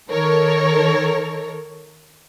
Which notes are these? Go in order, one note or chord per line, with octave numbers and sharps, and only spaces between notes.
D#3 A4 A#4 C#5